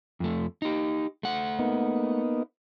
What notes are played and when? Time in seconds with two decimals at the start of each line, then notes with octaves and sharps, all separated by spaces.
0.20 F2 A3
0.62 D#4 G4
1.23 A3 F#5
1.59 A#3 B3 D#4